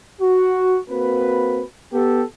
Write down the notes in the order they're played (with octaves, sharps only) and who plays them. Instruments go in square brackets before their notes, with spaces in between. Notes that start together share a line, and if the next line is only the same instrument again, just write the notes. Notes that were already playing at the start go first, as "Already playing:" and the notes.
[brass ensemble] F#4
A#3 C4 F#4 B4
B3 G4 A4